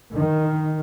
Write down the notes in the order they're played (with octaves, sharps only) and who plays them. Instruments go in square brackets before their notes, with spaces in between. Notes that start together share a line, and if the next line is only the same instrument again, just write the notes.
[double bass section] D#3